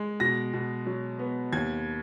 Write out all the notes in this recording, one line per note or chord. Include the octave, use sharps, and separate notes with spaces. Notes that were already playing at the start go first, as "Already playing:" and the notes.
Already playing: G#3
B2 A#6
B2
F#3
B3
D#2 G#6